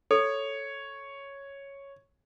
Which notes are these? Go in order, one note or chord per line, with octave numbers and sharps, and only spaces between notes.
A4 C#5